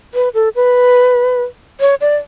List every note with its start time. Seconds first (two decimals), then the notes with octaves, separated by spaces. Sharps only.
0.14 B4
0.34 A4
0.55 B4
1.80 C#5
2.01 D5